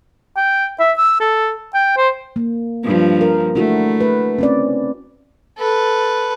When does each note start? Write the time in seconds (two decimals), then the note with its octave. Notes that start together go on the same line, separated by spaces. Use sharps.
0.37 G5
0.80 E5
0.98 E6
1.20 A4
1.74 G5
1.97 C5
2.36 A#3
2.84 G2 F3
3.21 A#4
3.55 A3 D4 E4 F#4
4.00 B4
4.39 C4 C#4 D5
5.58 A4 B4